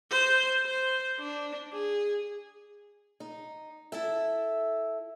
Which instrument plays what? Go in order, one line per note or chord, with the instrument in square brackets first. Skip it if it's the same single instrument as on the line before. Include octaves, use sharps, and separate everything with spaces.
[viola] C5
C5
D4
G#4
[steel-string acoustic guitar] D#4
E4 A4 E5